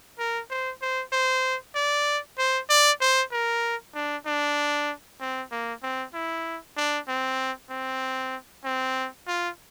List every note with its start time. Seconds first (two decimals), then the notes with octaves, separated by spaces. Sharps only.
0.19 A#4
0.50 C5
0.82 C5
1.13 C5
1.75 D5
2.38 C5
2.69 D5
3.01 C5
3.32 A#4
3.95 D4
4.26 D4
5.20 C4
5.52 A#3
5.83 C4
6.14 E4
6.77 D4
7.08 C4
7.70 C4
8.65 C4
9.27 F4